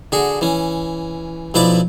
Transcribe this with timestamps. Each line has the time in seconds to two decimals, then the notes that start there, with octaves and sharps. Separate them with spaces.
0.12 D3 F#4 G#4
0.41 E3 C#4
1.54 B1 F3 E4 B4 D5 D6